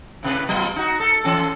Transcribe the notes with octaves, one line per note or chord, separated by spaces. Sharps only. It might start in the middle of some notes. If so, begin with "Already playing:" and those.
A2 C3 B4
F#3 B3 F4
D#4 F#4
A4
E3 C#4 A4